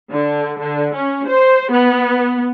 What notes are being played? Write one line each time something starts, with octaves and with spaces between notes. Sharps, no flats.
D3
D3
C#4
C5
B3